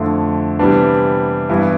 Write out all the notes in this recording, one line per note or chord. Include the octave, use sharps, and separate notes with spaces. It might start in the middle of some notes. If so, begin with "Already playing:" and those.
Already playing: F2 D3 A3 E4
C3 E3 G3 B3 D4
G2 E3 B3 E4